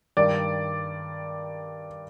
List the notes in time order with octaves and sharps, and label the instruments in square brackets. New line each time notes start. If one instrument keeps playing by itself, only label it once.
[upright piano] G2 D#3 D5